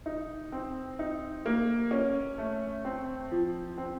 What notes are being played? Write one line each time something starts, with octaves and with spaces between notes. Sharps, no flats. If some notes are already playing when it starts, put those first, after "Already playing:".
D#4
C4
D#4
A#3
C#4
A3
C4
F3
C4